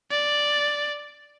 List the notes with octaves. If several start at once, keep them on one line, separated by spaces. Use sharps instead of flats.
D5